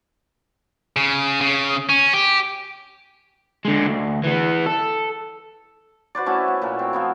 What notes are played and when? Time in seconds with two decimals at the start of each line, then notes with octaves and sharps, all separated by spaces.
0.96 C#3
1.41 C#3
1.89 C#4
2.14 G4
3.65 D3 G#3
3.87 D2
4.24 E3 B3
4.66 A4
6.15 F#4 B4 C5 D5
6.26 A3 C#4 E4 F#4
6.48 B3
6.62 A#2 A3 A#4
6.79 C4
6.93 F3 B3 E4